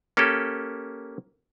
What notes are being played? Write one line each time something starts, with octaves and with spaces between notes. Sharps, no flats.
A#3 C#4 G4 A4